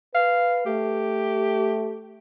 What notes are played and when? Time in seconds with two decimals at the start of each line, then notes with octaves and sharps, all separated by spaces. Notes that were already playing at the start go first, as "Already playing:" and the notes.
0.15 B4 F5
0.66 A3 G4